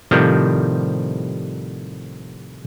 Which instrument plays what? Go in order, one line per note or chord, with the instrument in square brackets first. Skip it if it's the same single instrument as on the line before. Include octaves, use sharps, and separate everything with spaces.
[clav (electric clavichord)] A2 C3 D#3 F3 G3